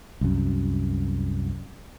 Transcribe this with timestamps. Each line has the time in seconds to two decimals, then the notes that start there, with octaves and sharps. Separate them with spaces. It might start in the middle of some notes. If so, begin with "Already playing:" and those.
0.21 C2 F#2